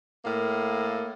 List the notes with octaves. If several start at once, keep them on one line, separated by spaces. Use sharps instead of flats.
A2 A#3